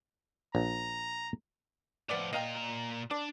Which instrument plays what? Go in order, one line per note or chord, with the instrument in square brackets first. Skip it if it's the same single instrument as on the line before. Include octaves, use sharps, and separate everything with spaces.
[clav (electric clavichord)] A#1 [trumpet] A#5
[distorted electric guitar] A2 F3 [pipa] B3 D5
[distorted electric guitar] A#2 A#5 [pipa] D#5 F5 G5
[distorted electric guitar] D4 [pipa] D5